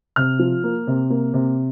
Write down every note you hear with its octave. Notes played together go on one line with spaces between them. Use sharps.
C3 F6
F3
A#3
C3
A#3
C3